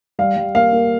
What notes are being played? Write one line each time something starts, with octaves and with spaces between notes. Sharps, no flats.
G3 F5
G3
A#3 F5
A#3